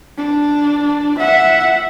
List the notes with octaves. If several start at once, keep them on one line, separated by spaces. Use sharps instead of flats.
D4
E5 F#5